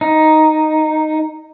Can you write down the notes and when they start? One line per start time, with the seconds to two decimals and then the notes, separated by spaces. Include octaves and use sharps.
0.01 D#4